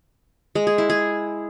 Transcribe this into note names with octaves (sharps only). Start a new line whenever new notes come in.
G#3
G#4
E4
G#4